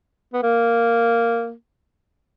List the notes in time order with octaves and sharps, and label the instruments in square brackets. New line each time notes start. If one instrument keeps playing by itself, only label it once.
[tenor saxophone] B3
A#3